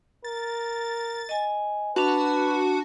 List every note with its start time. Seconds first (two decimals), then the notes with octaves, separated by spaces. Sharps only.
0.24 A#4 A6
1.29 D#5 G#5
1.96 D4 F#4 B4 A5